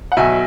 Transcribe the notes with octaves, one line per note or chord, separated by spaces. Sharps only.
F#5
B1 B2 F#3 E5 G#5